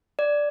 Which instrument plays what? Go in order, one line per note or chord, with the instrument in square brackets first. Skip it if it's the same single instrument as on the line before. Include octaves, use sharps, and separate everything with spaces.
[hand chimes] D5